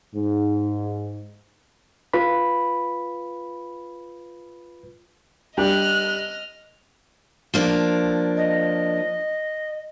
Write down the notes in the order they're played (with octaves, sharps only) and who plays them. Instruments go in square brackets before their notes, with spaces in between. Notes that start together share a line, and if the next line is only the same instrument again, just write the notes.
[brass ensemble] G#2
[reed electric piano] F4 B4 B5
[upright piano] G3 D4 G4 [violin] D#5 F6 [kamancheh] F#6
[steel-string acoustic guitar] F3 A#3 D4
[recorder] D#5